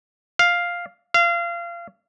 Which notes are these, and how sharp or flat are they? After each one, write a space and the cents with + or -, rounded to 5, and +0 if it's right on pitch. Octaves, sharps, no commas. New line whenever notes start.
F5 +0
F5 -30